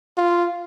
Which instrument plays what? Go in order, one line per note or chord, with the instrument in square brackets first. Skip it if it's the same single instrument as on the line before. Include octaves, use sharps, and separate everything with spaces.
[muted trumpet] F4